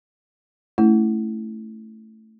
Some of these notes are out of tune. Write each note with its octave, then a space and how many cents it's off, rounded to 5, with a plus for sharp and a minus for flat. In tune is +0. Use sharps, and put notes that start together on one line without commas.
A3 +0 C#4 +15 E4 +0